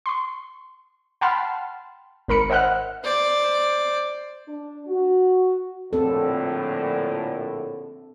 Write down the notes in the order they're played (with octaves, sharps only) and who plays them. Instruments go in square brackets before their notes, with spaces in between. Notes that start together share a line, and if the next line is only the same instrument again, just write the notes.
[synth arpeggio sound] C6 C#6
F#5 G5 A5 B5 C6 F6
G#1 A#4 B5 C#7
C5 D#5 E5 F#5 F6 F#6
[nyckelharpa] C5 D5
[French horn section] D4
F#4
[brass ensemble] A#1 A2 D3 [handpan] C4 A4